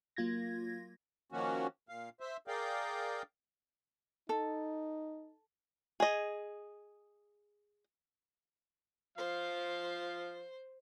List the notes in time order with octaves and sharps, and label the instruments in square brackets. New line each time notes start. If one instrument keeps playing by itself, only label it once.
[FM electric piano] F#3 A#3 F4 G#6 A#6
[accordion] D#3 F3 A#3 C#4 F#4
A#2 F5
C5 E5
G#4 A#4 D5 F5 G5
[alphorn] D#4 [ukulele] A4
[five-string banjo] G#4 D#5
[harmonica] F3 F5 [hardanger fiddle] C5